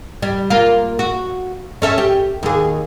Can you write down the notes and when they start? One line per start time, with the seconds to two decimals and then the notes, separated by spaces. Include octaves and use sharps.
0.22 G3
0.50 A#3 F4
0.99 F#4
1.82 C#4 A4 E5
1.98 G4
2.43 D#2 G#4